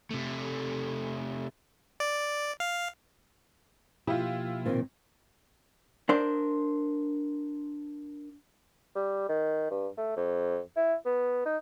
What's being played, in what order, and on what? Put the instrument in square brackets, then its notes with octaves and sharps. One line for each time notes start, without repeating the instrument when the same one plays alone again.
[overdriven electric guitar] C3 A3
[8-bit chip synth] D5
F5
[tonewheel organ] B2 F3 A#3 [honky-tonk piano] E4 F4 [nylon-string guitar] G4
[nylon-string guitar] A#2 D#3 C4
[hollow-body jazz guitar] D4 A#4 C5
[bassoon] G3
D#3
G2
A3
F2
E4
B3
D#4